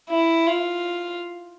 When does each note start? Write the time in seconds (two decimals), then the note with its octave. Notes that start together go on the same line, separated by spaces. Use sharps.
0.09 E4
0.47 F4